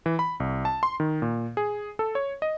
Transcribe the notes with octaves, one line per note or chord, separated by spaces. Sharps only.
E3
B5
C2
A5
C6
D#3
A#2
G#4
A4
C#5
D#5